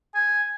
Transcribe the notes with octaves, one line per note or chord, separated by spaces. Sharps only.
G#5